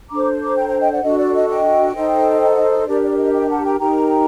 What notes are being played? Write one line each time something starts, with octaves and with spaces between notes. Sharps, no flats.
D4 A4 C5 A#5 D6
A#5 D6
G5 A#5
G5 A#5
D#5 G5
D5 F#5
D4 F#4 A4 D#5
D5
D#5
D#5 G5
D#4 A4 C5
D#5
F#5
D#5
D#5
D4 G4 A#4 D5
D5
D#5
D#5 G5
F#5 A5
G5 A#5
D#4 G4 A#4 G5 A#5